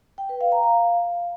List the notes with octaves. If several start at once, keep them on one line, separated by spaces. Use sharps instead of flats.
G5
B4
F5
A#5
F5